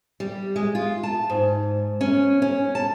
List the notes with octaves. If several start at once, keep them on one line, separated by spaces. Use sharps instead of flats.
G3
G#3
F4
A5
G#2
C#4
C#4
A5